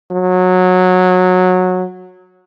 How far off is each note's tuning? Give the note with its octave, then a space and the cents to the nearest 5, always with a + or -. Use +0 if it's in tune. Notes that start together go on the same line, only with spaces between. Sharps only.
F#3 -15